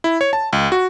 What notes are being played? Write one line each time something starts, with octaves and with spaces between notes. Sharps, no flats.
E4
C#5
A5
C#2
F#4